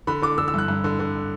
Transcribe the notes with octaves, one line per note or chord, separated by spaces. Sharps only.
D3 B5
D3 D6
D3 E6
E6
G2 F#6
G2
D3
D3